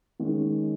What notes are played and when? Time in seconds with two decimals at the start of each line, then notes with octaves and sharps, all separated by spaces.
0.19 D#3 G#3 C#4